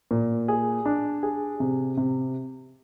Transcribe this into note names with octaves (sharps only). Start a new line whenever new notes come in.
A#2
G#4
D4
G#4
C3
C3